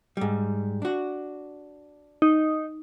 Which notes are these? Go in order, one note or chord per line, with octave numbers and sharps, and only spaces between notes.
G#2 G3
D4 F#4
D#4